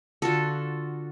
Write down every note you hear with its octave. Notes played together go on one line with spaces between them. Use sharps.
D3 F4 F#4 A4